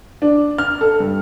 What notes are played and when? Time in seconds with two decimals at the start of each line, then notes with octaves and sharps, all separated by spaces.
0.22 D4
0.58 F6
0.81 A4
1.00 G2